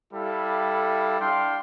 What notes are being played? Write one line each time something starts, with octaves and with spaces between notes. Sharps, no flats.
G3 E4 A4 F5
D4 F5 G5 C6